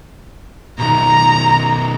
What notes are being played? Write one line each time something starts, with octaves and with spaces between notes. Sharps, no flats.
B2 D#3 A#5